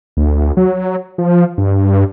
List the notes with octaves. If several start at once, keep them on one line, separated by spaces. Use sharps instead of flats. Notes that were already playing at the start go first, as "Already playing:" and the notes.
D2
F#3
F3
G2